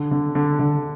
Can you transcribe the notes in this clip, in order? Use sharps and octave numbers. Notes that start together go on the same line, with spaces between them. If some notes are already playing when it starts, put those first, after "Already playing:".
Already playing: D3
D3
D3
D3